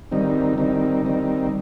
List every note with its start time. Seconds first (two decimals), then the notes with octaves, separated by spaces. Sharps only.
0.12 D#3 G3 C4 D#4
0.58 D#3 G3 C4 D#4
1.05 D#3 G3 C4 D#4